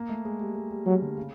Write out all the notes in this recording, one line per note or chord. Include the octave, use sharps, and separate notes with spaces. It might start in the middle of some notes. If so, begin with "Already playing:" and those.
Already playing: A#3
A3
G#3
G3
G#3
G3
F#3 G3
D3
C#3